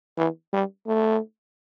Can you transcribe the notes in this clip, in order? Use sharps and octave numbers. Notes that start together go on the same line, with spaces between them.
E3
G3
A3